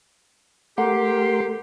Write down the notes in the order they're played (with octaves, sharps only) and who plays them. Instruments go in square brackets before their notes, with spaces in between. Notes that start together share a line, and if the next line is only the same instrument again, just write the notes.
[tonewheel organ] A3 A#4 C6 [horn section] G4 [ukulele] F#5